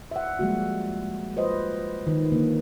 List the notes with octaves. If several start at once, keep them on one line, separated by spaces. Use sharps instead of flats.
E5 F#5
F3 G3 G#3 A#3 F#4
F4 B4 C5 D#5
D#3 B4
D3 A#3